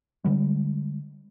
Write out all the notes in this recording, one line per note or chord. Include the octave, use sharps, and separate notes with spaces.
D3 G3 G#3